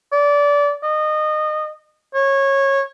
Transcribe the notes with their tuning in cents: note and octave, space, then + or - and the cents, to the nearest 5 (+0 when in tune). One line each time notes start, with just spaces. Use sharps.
D5 -25
D#5 -25
C#5 -20